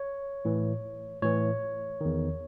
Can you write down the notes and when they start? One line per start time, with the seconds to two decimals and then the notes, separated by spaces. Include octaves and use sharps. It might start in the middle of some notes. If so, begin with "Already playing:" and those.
Already playing: C#5
0.45 A2 E3
1.22 A2 E3 C#5
2.01 E2 D#3